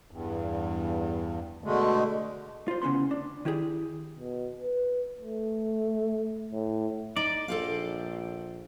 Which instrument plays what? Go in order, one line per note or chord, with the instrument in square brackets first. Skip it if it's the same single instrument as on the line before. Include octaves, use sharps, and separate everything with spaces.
[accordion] E2 G2
B2 D3 G#3 A3
[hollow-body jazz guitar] F4 C5
D2 C#3 E3 B3 C6
D4
D#3 E4 G4 G#4
[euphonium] B2
B4
A3
A2
[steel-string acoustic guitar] D#4 [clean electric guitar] D5
[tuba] A#1 [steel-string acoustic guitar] A4 C5 F5